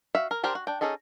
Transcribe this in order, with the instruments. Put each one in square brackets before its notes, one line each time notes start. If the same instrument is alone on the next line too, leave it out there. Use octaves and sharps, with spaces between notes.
[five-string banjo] F#4 E5 F5
A#4
D4 G4 A#4 C5
F#4
D4 G5
C#4 D#4 G#4 A4 D#5